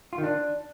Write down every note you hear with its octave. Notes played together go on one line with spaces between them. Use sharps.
F4
D#3
D4